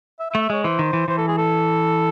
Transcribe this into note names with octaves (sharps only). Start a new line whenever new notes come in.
E5
E5
A3
E5
G#3 C#5
E3 C5
D#3
E3
E3 C5
A4
G#4
A4